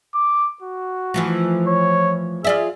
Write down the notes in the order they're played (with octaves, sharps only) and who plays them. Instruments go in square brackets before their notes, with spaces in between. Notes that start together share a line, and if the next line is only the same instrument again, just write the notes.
[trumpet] D6
F#4
[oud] E3 F3 A3
[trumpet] C#5
[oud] F4 D5 E5 [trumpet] G#4